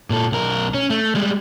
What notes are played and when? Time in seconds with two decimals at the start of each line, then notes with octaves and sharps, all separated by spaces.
0.10 A#2 A4
0.32 B1 A#4
0.74 C#4
0.90 A3
1.15 G3 G#3